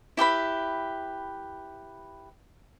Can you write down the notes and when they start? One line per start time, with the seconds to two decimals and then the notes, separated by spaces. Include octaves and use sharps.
0.17 E4 G4 B4 B5